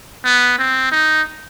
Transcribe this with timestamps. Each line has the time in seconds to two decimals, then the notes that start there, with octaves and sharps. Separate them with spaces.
0.24 B3
0.59 C4
0.91 D#4